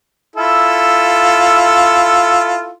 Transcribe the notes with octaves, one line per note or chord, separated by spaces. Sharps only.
E4 F4 A4